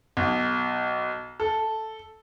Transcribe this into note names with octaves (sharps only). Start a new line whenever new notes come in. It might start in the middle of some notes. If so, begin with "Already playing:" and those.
B1
A4